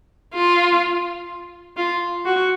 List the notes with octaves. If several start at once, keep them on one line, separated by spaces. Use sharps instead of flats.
F4
F4
F#4